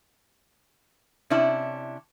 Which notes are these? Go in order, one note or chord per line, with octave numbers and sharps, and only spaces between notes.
C3 C#4 D4 E4